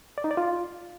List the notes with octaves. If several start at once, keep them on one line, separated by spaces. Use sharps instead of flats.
D5
D#4
D5
F4